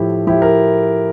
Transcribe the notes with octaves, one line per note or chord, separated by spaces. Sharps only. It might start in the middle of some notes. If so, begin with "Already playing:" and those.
Already playing: A2 F3 E4 G4
F3 E4 G4
A#4